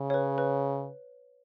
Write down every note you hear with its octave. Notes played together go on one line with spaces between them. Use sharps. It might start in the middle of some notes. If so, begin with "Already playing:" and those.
Already playing: C#3
C#5
B4
B4